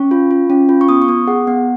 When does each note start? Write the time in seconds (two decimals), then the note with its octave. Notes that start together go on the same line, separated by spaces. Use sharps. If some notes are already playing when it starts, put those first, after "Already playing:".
Already playing: C#4 C#6
0.11 F4
0.31 F4
0.50 C#4
0.69 F4
0.81 C#6
0.89 B3 D#6
1.02 C#6
1.08 B3 D#6
1.27 G#4 F#5
1.47 B3 F#5